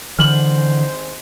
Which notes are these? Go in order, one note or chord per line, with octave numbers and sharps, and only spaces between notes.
G#1 D3 E3 G#3 C5 F6 F#7